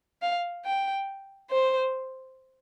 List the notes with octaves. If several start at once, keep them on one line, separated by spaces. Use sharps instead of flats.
F5
G5
C5